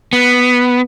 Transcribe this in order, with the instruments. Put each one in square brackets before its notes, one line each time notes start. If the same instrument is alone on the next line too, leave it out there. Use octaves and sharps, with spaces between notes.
[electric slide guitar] B3